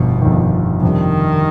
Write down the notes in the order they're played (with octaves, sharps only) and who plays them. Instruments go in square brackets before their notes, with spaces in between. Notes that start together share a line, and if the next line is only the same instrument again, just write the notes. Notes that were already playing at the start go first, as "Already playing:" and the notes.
Already playing: [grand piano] G1 F2 D#3 [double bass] B2
[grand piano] G1 F2 D#3
[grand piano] F2 C3 G3 D4 [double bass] D#3